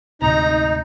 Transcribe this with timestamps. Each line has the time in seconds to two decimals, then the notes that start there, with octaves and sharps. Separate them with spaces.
0.22 D2 G#2 C3 D#4 A#5